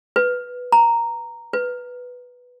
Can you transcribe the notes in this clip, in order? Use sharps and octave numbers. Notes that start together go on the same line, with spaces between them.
B4
A#5
B4